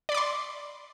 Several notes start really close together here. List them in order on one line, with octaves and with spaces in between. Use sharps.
D5 B5 D6 C6